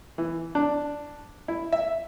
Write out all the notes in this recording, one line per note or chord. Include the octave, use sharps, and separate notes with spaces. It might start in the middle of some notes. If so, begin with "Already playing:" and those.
E3
D4
E4
E5